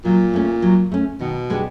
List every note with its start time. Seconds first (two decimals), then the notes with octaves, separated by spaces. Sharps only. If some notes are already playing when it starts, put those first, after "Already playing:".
0.04 A#2 F#3
0.34 A3 C#4
0.62 F#3
0.92 A3 C#4
1.20 B2 D#3
1.50 G#3 B3 D4 G4